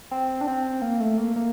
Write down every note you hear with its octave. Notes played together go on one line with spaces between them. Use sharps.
C4
D4
C4
A#3
A3
A#3
A#3